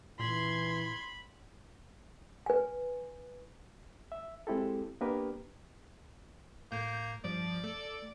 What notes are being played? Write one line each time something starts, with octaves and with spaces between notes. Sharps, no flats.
A#2 E3 B5 C6 G#6
B4 G#5
E5
G#3 C4 E4 G4 A4
A#3 B3 D4 G4 A#4 B4
A2 A#3 G6
G2 F3 D5
A3 A4